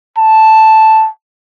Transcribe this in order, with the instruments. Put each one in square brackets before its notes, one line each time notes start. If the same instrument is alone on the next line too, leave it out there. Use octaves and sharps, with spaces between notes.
[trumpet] A5